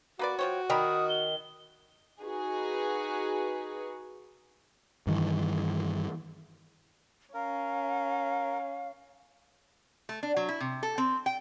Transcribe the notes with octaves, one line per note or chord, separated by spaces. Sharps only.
A#3 F#4 B4 D5
F3 C5 C#5 G5
D#3 G5 A#5 B5 D#6
G7
D#4 F#4 G#4 B4
G2 D#3 E3
C#4 A#4 F5
A3
D4
F#3
E4
C3
A4
C4
G5